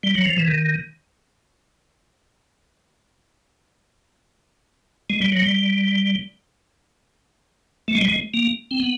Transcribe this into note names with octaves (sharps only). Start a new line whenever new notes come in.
G3
F#3
F3
E3
D#3
G#3
G3
F#3
G3
A3
G#3
G3
G#3
A#3
C4
B3